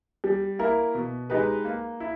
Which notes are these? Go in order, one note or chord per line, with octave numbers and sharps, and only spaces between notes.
G3
A#3 E4 A#4
B2
G#3 D#4 G4 B4
A#3
E4